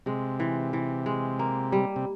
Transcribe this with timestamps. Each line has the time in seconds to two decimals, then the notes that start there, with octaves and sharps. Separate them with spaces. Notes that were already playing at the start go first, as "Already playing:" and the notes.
0.06 C3 G#3
0.40 E3
0.73 E3
1.06 G#3
1.39 A#3
1.72 G3
1.96 C3